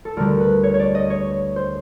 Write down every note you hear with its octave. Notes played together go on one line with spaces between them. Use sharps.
A4
D2 D3 G3 A#4
B4
C#5
C#5
D5
D#5
C#5
C5